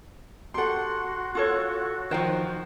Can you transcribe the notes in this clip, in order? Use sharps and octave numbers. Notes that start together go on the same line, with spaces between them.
F#4 G4 A4 F#5 C6
F4 A4 C#5
D#3 F3 C5 G5